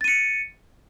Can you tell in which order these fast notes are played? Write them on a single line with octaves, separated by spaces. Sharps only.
A6 D#7 C#7